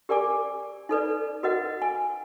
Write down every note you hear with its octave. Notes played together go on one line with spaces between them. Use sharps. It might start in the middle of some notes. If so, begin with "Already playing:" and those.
G4 A#4 D5 G#5 D6
D#4 A4 B4 D5
F#4 A#4 B4 D#5 F#5
G#5